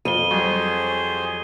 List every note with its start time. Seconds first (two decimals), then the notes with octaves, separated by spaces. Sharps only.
0.05 F2 D#7 G7
0.31 F#3 G3 G#4 C5 C#6